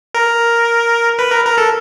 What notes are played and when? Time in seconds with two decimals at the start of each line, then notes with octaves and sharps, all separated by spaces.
0.14 A#4
1.19 B4
1.31 A#4
1.45 A#4
1.58 A4